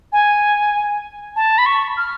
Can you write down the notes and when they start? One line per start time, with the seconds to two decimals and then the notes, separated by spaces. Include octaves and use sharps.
0.13 G#5
1.36 A5
1.58 B5
1.66 C#6
1.97 F6